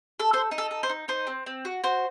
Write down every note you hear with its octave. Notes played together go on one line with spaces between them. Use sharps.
A4
A4 C5
D#4
A4
A4
C5
D#4
D#4 C5
C4
C4
F#4
F#4 C5